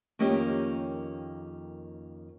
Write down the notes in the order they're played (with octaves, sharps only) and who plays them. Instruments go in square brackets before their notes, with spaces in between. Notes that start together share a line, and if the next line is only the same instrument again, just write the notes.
[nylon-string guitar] F2 D#3 A#3 C#4 G4 D#5